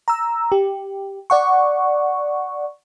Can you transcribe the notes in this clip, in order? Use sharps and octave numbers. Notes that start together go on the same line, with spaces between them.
A#5 E6
G4
D5 F#5 C#6